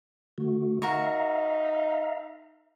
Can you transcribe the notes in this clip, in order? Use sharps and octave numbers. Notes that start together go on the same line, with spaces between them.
D3 A3 F#4
D#4 F#4 A#4 E5 F5 A#5 C#6